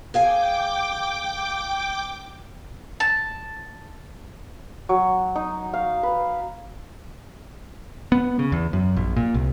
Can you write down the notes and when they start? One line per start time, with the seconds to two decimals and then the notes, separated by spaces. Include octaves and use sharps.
0.14 G#4 F5 G5 G#5 D6
3.00 A5
4.89 F#3
5.36 D#4
5.74 F5
6.03 B4
8.12 B3
8.39 C#3
8.52 E2
8.73 F#2
8.96 A#1
9.16 A#2
9.34 C2